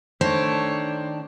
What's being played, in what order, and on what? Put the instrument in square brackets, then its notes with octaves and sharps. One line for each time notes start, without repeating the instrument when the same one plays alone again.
[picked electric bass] D#3 [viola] A3 C#5 [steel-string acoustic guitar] D4 [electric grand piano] C5